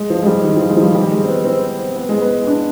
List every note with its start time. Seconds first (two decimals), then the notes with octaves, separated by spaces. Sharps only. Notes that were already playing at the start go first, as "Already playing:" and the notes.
Already playing: G#3
0.10 F3
0.23 G#3
0.26 G3
0.44 D#3
0.57 F3
0.70 G#3
0.77 F3
0.82 G3
0.95 G3
1.12 G#3
1.24 C4
1.29 B3
1.45 C4
1.96 B3
2.09 G#3
2.22 B3
2.47 D4